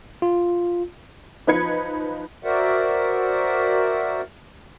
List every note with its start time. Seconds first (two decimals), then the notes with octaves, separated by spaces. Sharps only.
0.22 F4
1.47 F3 D#4 B4 G#6 C#7
2.44 F#4 A#4 C5 D5 E5 F#5